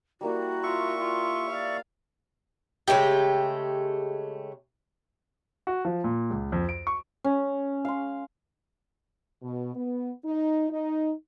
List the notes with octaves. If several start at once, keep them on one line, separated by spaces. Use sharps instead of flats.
G3 A#3 E4 F#4
F4 E5 C#6
F4
D5 F5
C#3 G#3 A3 G4
F#4
F3
A#2
C#2
F2
D7
C#6
C#4
F5 C6
B2
B3
D#4
D#4